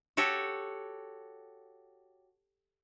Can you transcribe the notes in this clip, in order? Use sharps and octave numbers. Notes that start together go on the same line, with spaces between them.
F#4 G4 A4 C#5